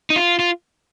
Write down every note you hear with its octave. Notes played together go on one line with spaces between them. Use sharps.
D#4
F4
F4